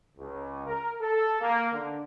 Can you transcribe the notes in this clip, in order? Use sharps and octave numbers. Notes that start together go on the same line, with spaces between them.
C#2
A#4
A4
A#3
D3